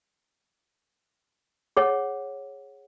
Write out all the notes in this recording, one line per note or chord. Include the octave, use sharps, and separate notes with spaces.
G#4 C#5 F#5